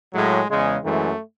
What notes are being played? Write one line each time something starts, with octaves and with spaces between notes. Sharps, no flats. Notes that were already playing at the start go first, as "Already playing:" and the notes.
A2 F#3 G#3
E2 C#3 G#3
F#2 E3 G#3 A3